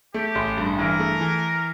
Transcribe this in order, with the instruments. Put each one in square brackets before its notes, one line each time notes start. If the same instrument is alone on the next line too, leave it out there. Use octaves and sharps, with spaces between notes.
[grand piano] A3 [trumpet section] G4
[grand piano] A1
G2
[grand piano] E3 [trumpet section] A#4
[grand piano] A3
E3